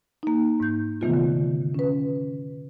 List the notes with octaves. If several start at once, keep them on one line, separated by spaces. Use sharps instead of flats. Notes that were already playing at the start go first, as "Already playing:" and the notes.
A#3 D#4
G#2 G6
C3 D#3 E3 A3 B3 F4
D3
C#4 B4